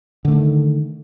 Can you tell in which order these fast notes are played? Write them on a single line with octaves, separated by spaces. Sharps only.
D3 A3 D#3